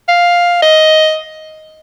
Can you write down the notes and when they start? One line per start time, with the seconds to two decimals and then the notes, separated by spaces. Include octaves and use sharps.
0.08 F5
0.62 D#5